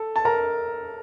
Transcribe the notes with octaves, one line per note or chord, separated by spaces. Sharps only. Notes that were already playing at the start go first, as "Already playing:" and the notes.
Already playing: A4
A5
A#4 A#5